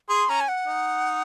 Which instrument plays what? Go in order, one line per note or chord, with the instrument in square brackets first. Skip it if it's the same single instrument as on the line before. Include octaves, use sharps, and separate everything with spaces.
[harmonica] G#4 [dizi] C6
[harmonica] C#4 [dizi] A#5
[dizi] G#5
F#5
[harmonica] D#4